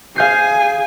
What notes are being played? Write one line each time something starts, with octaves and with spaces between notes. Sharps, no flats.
G#4 F5 G#5 G6 C7